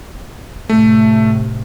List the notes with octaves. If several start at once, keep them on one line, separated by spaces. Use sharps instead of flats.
A2 C3 A3